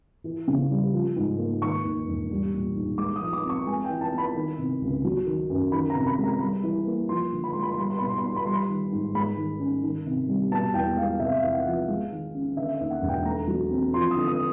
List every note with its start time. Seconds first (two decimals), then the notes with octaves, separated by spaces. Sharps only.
0.24 E3
0.48 C#3
0.71 G3
0.93 F3
1.16 G#2
1.38 A#3
1.62 D#3 C#6
1.84 D#2
2.07 E1
2.31 G3
2.53 A#2
2.76 B1
2.98 G#3 D6
3.16 D#6
3.21 F3
3.33 D6
3.44 C4
3.49 C#6
3.66 G#3 G#5
3.84 G5
3.90 E3
4.01 A5
4.13 B3
4.18 B5
4.36 D#3
4.59 C3
4.81 C#2
5.04 F#3
5.26 D#3
5.50 F#2
5.72 D#3 B5
5.90 A#5
5.95 C3
6.07 B5
6.19 G#3
6.24 A#5
6.40 G3 B5
6.63 E3
6.87 A#3
7.09 F3 C6
7.33 D3
7.44 B5
7.53 G#3 C6
7.63 B5
7.72 C6
7.78 G3 B5
7.90 C6
7.99 B2 B5
8.09 C6
8.18 B5
8.23 B3 C6
8.36 B5
8.46 G3 C6
8.55 B5
8.69 D#3
8.92 G#2
9.15 G#3 B5
9.37 D#3
9.60 C#4
9.83 D#3
10.06 C3
10.28 G3
10.51 B2 A5
10.74 E2 G5
10.97 G#3 F5
11.20 C3 E5
11.37 F5
11.43 E2
11.54 F#5
11.66 F3
11.71 F5
11.88 G#3
12.11 D#3
12.35 C#4
12.56 D3 E5
12.75 E5
12.80 D#2
12.91 F#5
13.02 E1
13.08 G5
13.25 A3 A#5
13.48 F#3
13.71 C4
13.94 F3 C6
14.11 D#6
14.16 D3
14.27 D#6